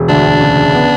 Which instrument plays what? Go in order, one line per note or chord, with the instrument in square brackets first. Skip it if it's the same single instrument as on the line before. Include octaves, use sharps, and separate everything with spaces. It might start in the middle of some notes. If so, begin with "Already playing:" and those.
Already playing: [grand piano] E1
[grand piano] D2 [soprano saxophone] D4
[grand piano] C#3
B3